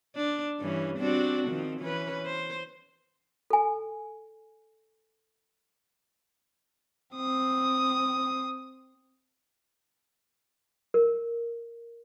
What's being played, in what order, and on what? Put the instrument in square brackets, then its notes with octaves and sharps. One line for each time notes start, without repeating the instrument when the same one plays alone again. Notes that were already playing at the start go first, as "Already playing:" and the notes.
[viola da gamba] D4
G2 E3 C#4
C4 D4 F#4
D#3 F3 C4
E3 C#4 B4
C5
[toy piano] A4 G#5
[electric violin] C4 D#6
[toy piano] A#4